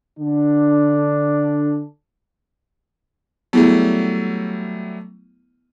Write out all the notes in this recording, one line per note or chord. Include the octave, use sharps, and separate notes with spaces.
D3 D4
F#3 G3 A3 B3 E4 G#4